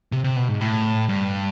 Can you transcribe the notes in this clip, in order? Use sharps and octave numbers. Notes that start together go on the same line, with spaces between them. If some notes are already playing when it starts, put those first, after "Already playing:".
C3
C3
B2
G#2
A2
G2